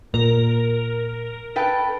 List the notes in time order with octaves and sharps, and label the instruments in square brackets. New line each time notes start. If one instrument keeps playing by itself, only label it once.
[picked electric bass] A#2 [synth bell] A#4
[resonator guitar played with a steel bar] A4 B4 G5